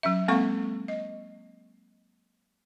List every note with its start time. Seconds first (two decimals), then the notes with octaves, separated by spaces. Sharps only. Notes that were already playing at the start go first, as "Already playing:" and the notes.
0.03 F#3 C#4 E5
0.28 G#3 A#3 C4 A4 F5 C#6
0.88 D#5